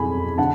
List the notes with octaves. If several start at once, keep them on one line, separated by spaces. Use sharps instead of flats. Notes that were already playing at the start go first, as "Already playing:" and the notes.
Already playing: F2 G#3 G#5 B5
D3 F#5 A5